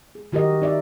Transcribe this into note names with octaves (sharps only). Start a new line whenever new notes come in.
G#4
D#3 F#4 G4 A#4 D#5
D#4 D5 E5